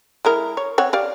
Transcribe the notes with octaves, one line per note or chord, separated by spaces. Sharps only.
G#3 E4 A#4
C#5
C4 C#5 F#5
G4 D5 F5